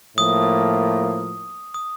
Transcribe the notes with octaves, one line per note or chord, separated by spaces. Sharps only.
A2 F3 A#3 D#6
D#6